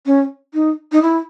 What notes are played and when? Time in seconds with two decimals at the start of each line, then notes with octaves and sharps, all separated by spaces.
0.06 C#4
0.54 D#4
0.92 D#4
1.02 E4